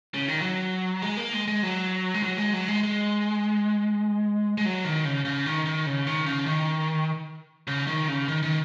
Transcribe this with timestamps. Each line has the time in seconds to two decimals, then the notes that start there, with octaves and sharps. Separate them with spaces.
0.14 C#3
0.28 D#3
0.41 F#3
1.02 G#3
1.17 A#3
1.33 G#3
1.48 G#3
1.63 F#3
2.14 G#3
2.23 F#3
2.38 G#3
2.53 F#3
2.68 G#3
2.83 G#3
4.58 G#3
4.65 F#3
4.85 D#3
5.05 C#3
5.25 C#3
5.46 D#3
5.66 D#3
5.86 C#3
6.07 D#3
6.26 C#3
6.46 D#3
7.67 C#3
7.87 D#3
8.08 C#3
8.28 D#3
8.43 D#3